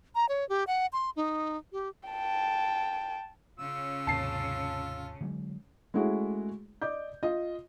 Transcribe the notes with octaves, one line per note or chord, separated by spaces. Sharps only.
A#5
C#5
G4
F#5
C6
D#4
G4
G5 A5
C#3 C#4 F4 E6
D#2 G#2 C3 A5 C7
D3 F#3 G#3
G#3 A3 C#4 E4 F#4 G#4
D5 D#5 D6 G6
F4 D#5